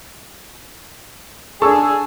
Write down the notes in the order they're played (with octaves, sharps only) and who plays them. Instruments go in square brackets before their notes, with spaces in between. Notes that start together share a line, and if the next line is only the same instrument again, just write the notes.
[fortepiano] D4 A4 [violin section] G#4 [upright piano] A5 E6 [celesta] C#6